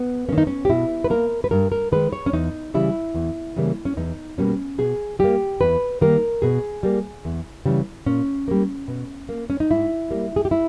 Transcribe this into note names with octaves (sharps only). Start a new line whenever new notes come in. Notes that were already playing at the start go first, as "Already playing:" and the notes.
Already playing: B3
D#3 A#3 C#4
D#4
C#4
G4
B2 E4
B4
A#3 A#4
B4
G2 A#4
A#4
D#3 G#3 B4
C#5
C#4
E2 D#4
C#3 E3 G3 E4
E2
C#3 E3 G3 A#3
C#4
E2 D#4
B2 G3 A#3 C#4
B2 G#4
G3 A#3 G4
E2 B4
D#3 G3 A#3 A#4
B2 G#4
G3 A#3
E2
C#3 E3 G3
A#2 C#4
G3 A#3
B2
A#3
C#4
D#4
G#2 E4
G3 A#3
G#4
G4
E4